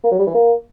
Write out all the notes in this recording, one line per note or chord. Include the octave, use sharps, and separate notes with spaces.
A#3
F#3
G3
E3
A#3